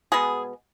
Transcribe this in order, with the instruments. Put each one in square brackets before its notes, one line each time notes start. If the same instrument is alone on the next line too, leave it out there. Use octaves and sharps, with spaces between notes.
[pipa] B2 G#3 B3 G#4